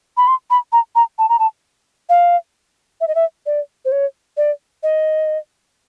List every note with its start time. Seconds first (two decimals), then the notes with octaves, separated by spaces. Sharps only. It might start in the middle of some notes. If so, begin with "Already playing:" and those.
0.17 B5
0.27 C6
0.50 B5
0.72 A#5
0.95 A#5
1.18 A5
1.29 A#5
1.39 A5
2.09 F5
3.01 E5
3.08 D#5
3.15 E5
3.46 D5
3.85 C5
3.92 C#5
4.37 D5
4.83 D#5